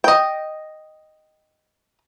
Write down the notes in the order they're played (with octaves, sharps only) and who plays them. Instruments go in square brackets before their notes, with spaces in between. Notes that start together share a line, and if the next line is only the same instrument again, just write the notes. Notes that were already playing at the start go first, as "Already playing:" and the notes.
[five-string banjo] D#5 G5